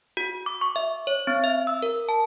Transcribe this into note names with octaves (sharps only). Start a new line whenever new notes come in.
F#4
D6
C#6
E5
C#5
C4
E5
E6
A#4
A5